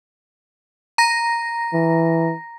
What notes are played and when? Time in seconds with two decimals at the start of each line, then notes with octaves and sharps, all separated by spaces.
0.98 A#5 A#6
1.73 E3